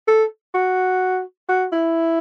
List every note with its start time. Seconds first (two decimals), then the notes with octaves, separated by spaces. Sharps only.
0.07 A4
0.54 F#4
1.49 F#4
1.72 E4